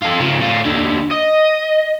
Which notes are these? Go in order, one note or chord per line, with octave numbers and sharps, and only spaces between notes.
F4 A4
C#3 F3
A2 F4
D#2 D3
D#5